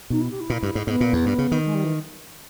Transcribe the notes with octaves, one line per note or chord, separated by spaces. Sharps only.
B2 D#4
E4
G4
E4
A#2
G2
G#2
G#2 B3
A#2
E2
G2
C#3
D#3
G#3
G3
E3